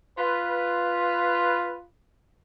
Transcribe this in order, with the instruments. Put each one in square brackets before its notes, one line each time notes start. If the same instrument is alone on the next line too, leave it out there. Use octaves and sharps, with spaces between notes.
[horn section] F4 B4